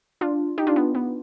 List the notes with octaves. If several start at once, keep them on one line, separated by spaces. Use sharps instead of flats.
D4 F4
D#4 G4
D4 F4
B3
B3